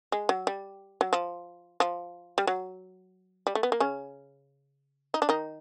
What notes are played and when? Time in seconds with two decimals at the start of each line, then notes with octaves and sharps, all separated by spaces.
0.12 G#3
0.29 F#3
0.47 G3
1.01 F#3
1.13 F3
1.80 F3
2.38 G3
2.47 F#3
3.47 G3
3.55 A3
3.63 B3
3.72 A#3
3.80 C#3 C#4
5.14 D#4
5.22 D4
5.29 D#3 D#4